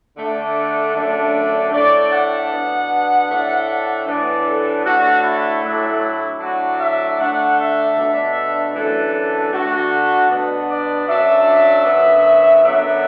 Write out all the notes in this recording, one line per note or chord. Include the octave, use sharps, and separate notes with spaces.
D3 A3 D4
F#2 D3 A3 D4
A2 A3 D4 D5
F#5
B2 B3 D4
A2 A3 D4
A2 E3 B3 D4 D5
A4
A2 A3 D4 F#4
E4
A2 F#3 A3 D4
A2 F#3 D4 F#4
E5
D3 A3 D4 F#5
E5
B2 A3 D4
F#2 E3 A3 D4 A4
D3 A3 D4 F#4
B2 B3 D4
D5
F#2 F#3 D4 E5
F#2 D3 F#3 B3
F#2 D3 F#3 B3 D4 E5